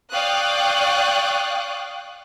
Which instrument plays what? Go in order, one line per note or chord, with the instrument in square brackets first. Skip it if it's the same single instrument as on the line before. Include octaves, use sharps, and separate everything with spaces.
[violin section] D5 F5 G5 C#6 D#6 F#6